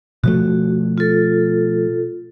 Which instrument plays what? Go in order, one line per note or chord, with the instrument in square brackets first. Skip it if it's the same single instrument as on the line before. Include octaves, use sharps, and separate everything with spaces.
[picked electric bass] B2 F3 A3 [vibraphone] F#4
[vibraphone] F4 A4